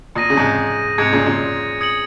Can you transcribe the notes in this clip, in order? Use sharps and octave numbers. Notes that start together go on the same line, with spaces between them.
A#2 D#6 A#6 D#7
C#3
G#2 C3
G#2 C3 G#6 C#7 F7
A#2 C#3
A#2 C#3
D#6 G#6 C#7 F#7